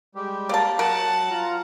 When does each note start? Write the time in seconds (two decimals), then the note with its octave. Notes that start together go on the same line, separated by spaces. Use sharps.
0.15 G3 G#3 G4
0.49 A#3 D5 A5
0.79 F#3 A#4 F#5 A5
1.30 F4 A#5